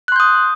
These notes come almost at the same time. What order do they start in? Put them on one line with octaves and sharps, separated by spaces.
F#6 C6 G6 D#6